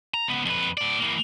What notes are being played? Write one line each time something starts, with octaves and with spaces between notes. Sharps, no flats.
A#5
C#2 B3
F2 B4
A2 D5
E3 A#3